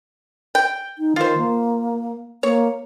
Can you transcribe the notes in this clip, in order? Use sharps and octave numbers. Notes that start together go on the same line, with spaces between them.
G5
D#4
D#3 F4 C5
A#3
A#3 C#5